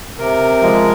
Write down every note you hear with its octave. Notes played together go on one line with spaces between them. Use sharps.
C3 A#4
F3 G#3